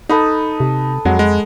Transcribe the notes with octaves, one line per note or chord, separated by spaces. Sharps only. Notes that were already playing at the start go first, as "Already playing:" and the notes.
D#4 A4 B4 D#6
C3
F2 F#3 G#3 F#5
G#3